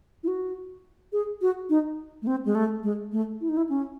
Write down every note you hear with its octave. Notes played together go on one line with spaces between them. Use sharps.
E4
F#4
G#4
F#4
D#4
A3
C4
G#3
A3
G#3
A3
E4
D#4
E4
C#4